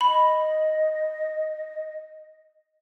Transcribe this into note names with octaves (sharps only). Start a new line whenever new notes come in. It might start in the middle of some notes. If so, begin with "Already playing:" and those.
D#5 B5